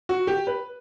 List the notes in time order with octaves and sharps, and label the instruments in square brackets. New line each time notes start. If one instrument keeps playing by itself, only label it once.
[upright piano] F#4
G4
B4